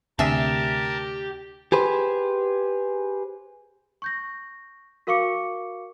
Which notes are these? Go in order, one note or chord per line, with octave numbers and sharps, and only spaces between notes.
D2 C3 D4 G4 G#4 A#4 E5 A5
G4 G#4 B4 C5
C#6 G6 A#6
F#4 A#4 F5 C#6 D6 C#7